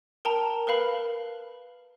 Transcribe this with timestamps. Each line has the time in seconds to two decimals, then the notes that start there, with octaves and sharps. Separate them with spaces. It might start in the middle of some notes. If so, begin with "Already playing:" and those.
0.25 A#4 G5 A5 A#5
0.67 A#4 B4 F5 B5